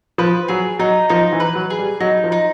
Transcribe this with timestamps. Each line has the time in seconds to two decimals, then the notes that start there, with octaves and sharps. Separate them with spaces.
0.18 F3 B4
0.48 F#3 G#4
0.79 F#3 D#4
1.09 F3 D#4
1.33 E3
1.40 B4
1.55 F#3
1.70 G#4
1.78 G3
2.00 F#3 D#4
2.24 F3
2.32 D#4